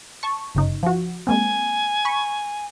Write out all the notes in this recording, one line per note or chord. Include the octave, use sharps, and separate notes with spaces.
A5 C#6
G1 C#3 D#4
F3 F#4
G#3 A#3 C4 G#5
B5 C#6